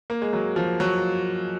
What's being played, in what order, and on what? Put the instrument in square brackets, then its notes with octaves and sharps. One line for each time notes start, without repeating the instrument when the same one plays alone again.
[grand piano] A#3
G#3
F#3
F3
F#3